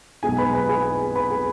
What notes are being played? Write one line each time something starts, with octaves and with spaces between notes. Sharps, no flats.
B1 B2 G#3 B3 G#4 G#5
B4 B5
B4 B5
G#4 G#5
B4 B5
G#4 G#5